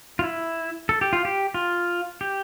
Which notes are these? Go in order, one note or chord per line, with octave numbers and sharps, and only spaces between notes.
F4
E4
A4
G4
F4
G4
F4
G4